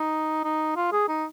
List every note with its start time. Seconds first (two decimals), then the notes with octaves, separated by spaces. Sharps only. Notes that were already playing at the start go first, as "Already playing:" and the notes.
Already playing: D#4
0.44 D#4
0.76 F4
0.92 G#4
1.08 D#4